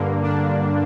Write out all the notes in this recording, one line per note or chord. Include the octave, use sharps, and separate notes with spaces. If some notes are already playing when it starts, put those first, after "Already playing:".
Already playing: G2 D3 A#3
D4